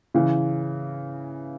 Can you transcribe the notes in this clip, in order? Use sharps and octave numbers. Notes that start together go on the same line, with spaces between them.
C#3 E3